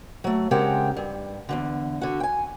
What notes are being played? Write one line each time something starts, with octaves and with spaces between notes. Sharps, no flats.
F#3 A3
C#3 G#3 C4 G4 A#4 F#5
G2
E2 G#2 D3
D3 F#4
G5 G#5